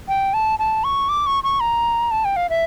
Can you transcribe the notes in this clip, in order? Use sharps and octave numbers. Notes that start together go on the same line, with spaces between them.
G5
A5
A5
C#6
D6
C#6
C#6
A#5
A5
G5
F5
E5